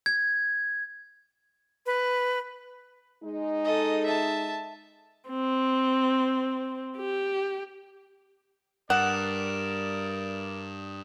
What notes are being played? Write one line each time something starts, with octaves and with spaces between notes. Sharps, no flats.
G#6
B4
G#3 D#4
A4 D#5
E5 A5
C4
G4
G2 A#4 D5 F#5 D#6 E7